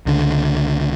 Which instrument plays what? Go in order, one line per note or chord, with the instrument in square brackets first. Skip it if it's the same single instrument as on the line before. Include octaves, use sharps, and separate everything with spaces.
[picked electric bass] C#2 D3